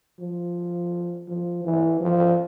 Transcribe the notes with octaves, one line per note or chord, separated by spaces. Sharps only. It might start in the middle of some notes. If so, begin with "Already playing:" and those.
F3
F3
E3
F3